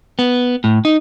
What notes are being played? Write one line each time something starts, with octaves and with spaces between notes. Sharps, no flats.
B3
A2
D#4